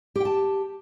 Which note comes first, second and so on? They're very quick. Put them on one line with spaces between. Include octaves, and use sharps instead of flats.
G4 G5 A5